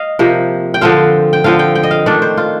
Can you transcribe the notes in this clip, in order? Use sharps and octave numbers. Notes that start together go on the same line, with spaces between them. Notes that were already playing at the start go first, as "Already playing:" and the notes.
Already playing: D#5 F5
C3 F3 A#3
G5
D3 F3 C4 F5
G5
D3 F3 C4 F5
G5
G5
D#5
F5
D#3 A3 D4 D5
C5
F4